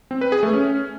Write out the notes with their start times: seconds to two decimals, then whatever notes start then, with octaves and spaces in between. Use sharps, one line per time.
0.11 C4
0.21 B4
0.32 G#4
0.43 A3
0.53 C#4